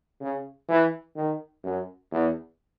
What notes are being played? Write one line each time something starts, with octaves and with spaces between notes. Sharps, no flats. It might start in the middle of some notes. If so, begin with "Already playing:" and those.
C#3
E3
D#3
F#2
E2